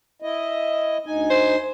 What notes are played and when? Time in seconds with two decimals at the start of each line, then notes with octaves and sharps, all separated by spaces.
0.22 E4 D#5
1.06 D2 D#4 G#5
1.30 C5